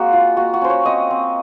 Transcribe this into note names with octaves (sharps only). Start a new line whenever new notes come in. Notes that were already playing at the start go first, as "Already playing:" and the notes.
Already playing: G#3 A#3 C4 F#4
F4
A#3 F#4
F#4
C#4 C5
C#5
C4 D#5
C4